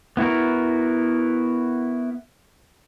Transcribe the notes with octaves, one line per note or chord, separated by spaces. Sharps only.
B3 E4 F#4 A#4